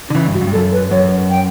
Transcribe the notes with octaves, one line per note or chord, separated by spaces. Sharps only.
D3 D4
C#3 E3 E4
G2
F#4
F#2
G2
A4
F#2
B4
F#2 C#5
G5